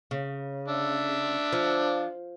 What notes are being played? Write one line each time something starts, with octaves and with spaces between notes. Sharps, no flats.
C#3
D4 E5
F3